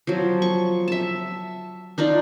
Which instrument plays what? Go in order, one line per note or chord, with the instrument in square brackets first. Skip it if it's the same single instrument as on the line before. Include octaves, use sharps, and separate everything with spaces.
[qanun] F3 F#3
C#6
E5 A5
D4 D#4 F4 D5